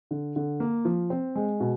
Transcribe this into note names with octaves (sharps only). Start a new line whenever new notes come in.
D3
D3
A#3
F3
C4
G#3
B2